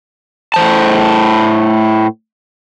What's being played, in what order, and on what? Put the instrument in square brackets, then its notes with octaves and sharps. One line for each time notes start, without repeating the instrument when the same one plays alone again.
[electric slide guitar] A2 C5 A5